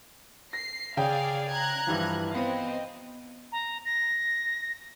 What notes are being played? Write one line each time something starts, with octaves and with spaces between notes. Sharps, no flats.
A#6 C7
C#3 G#4 D5 F5 G5
A#5 F#6 G#6
G2 E3 F3
B3 C4 D#5 F5
A#5
A#6